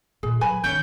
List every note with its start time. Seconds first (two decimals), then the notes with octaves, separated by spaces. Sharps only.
0.23 A#2 G#4
0.41 F#3 B4 G#5 B5
0.64 D#3 E3 C#4 C#5 G6